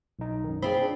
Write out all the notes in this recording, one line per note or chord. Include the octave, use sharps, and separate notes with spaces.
B1 D#4
F#2 D#3
C4 F4 G#4 B5
D4